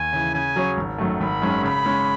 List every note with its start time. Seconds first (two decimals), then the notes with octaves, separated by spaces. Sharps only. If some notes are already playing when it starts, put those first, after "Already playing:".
Already playing: D#2 G#5
0.13 C#3 E3
0.34 C#3 G#5
0.56 F#3 C#4 G#4 C#5
0.77 G#1
0.98 F#2 D#3 F#3 A3
1.20 G#1 B5
1.42 F#2 D#3 G#3 C#4
1.63 C#3 B5
1.86 G#3 C#4